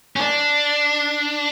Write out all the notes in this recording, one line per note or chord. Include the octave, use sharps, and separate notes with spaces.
C#4
D4